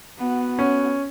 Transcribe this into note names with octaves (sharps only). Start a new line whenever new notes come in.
B3 F#4
C#4